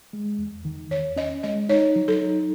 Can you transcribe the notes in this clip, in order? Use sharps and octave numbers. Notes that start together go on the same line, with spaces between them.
G#3
E2
D#3
E2 C#5
C#4 D#5
G#3 D#5
D#4 C#5
F#3
A4
D#4